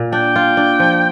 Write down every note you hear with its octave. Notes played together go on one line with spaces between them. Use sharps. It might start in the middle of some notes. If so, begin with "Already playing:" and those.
Already playing: A#2
D4 G5
F4
D4
F3